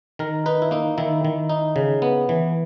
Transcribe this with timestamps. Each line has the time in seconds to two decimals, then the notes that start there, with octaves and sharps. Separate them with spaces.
0.19 D#3 A#4
0.46 D#4 B4
0.62 E4
0.71 A#3 D#4
0.98 D#3 E4
1.25 D#3
1.49 D#4
1.76 C#3
2.02 B3
2.29 E3